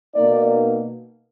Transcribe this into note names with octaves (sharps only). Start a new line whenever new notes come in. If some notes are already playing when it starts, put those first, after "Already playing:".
B2 A#3 D#4 D5